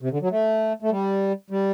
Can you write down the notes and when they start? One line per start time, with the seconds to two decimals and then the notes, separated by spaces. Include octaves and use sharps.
0.02 C3
0.11 D3
0.22 F#3
0.31 A3
0.82 A3
0.91 G3
1.50 G3